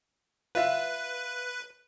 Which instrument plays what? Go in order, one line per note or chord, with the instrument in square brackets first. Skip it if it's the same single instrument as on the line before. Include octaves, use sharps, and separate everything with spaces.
[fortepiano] F4 E5 [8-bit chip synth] B4